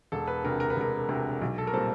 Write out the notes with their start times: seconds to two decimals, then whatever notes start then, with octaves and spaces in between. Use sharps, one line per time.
0.12 E1 A4
0.28 B4
0.44 D2 C3 A#4
0.60 A#4
0.70 B4
0.76 E1 A#4
1.09 D2 C3
1.41 B1
1.58 A4
1.67 A#4
1.73 A#2 G3 C4 A4